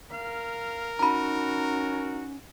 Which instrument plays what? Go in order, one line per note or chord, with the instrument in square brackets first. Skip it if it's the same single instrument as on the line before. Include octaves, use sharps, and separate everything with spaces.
[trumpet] A#4 [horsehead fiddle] F5
[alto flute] C#4 [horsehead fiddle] D#4 F#4 [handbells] A#5 B5